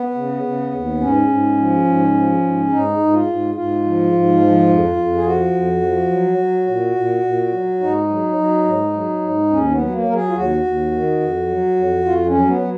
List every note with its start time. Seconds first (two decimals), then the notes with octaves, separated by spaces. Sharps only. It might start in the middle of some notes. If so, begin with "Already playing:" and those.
Already playing: B3
0.14 C#3
0.43 C#3
0.72 D#2
1.00 G#2 C#4
1.28 G#2
1.57 F3
1.85 G#2
2.14 F3
2.42 G#2
2.70 G#2 D#4
2.98 G#2
3.13 F4
3.27 G#2
3.55 G#2 F4
3.84 F3
4.12 G#2
4.40 F3
4.69 F2
4.96 F2
5.15 G#4
5.25 F3 F#4
5.53 F2
5.82 F3
6.11 F#3
6.38 F#3
6.67 A#2
6.96 A#2
7.23 A#2
7.52 F#3
7.80 G#2 D#4
8.08 F#3
8.36 F#3
8.65 G#2
8.93 F#3
9.21 G#2
9.50 D#2 C#4
9.71 B3
9.78 F#3
9.92 A#3
10.06 F#3 A#4
10.14 G#4
10.29 F4
10.35 D#2 F#4
10.64 D#2
10.91 D#3
11.20 F2
11.48 F#3
11.76 F2
12.05 F2 F4
12.26 C#4
12.34 F#3
12.48 B3
12.61 F#3